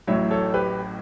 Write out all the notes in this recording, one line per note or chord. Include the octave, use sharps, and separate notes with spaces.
A1 A2 F#3 C#5 E5
A4 C#5
G4 B4